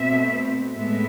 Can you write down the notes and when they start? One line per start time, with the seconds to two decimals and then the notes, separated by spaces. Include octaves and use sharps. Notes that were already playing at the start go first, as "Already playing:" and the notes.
Already playing: B2 A3 C4 E5
0.74 A2 G#3 B3 E5